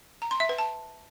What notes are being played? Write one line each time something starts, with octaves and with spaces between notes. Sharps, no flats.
A#5
C6
E5
B4
A5